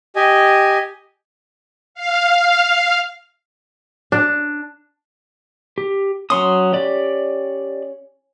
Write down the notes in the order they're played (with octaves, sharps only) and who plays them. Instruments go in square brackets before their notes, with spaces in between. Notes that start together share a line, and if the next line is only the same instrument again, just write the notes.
[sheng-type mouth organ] G4 D#5 G#5
[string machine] F5
[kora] D4
[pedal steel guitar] G4
[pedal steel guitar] F#3 C6 D#6 [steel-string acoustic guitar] C#4
[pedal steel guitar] G4 D5